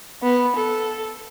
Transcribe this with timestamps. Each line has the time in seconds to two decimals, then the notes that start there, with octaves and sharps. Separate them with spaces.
0.23 B3
0.56 A4